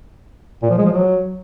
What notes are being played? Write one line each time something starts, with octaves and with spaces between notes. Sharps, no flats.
A#2
F3
G#3
F3
F#3